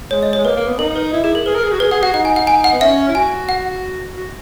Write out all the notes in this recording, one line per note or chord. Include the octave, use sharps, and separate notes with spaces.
G#3 C#5
D#5
C#5
G#3
A#3 B4
A#3
B3
D#4 A#4
B4
E4
E4 G#4
A#4
G#4 B4
A#4
G#4
F#4
G#4 B4
G#4 F#5
F#4 F#5
D#4 F#5
G#5
F#5
G#5
F#5
B3
C#4 E5
E4
F#4 G#5
F#5
F#4